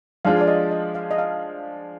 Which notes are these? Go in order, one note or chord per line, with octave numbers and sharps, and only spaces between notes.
F3 G#3 D4 F4 G#4 F5
D5
D#5
D#5
F5
D#5
F5